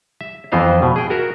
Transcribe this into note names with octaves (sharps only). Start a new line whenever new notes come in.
E5
F2 E3 B3 C5 D#5 F5
B2
G#4 G5
F#4 A#4 E5